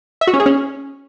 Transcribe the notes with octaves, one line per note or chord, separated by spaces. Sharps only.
E5
F#4
C#4
G#4
C#4